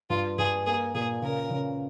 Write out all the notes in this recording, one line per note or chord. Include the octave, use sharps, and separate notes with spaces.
G2 F4
G2 G#4
A#3 G#4
A#2 G#4
C#3 A#4
C#3